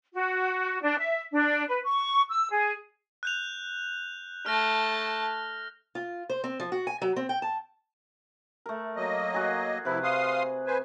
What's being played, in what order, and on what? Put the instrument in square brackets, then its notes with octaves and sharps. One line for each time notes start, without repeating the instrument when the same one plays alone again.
[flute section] F#4
D4
E5
D4
B4
C#6
E6
G#4
[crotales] F#6 G6 F7
[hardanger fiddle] A3 A5 [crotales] F6 A#6
[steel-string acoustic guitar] F4
C5
C4
F3
F#4
G#5
F#3
C4
G5
A5
[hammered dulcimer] A3 A#4
[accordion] F#3 A#3 D#5
[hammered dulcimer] F#4 G#4
[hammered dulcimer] C3 B4 [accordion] F3 E4
[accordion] F5 C6 D#6
B4 C5 G#5